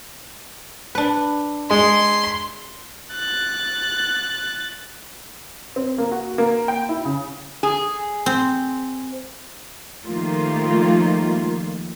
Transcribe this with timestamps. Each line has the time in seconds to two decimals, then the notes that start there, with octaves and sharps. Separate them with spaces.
0.95 D4 B4
1.70 G#3 C6
3.13 F#6 A6
5.76 C4
5.98 A#3
6.12 F#4
6.38 A#3
6.68 G5
6.89 E4
7.05 C#3
7.63 G#4
8.26 C4
10.04 D#3 F3 G3 A3 A#3 F4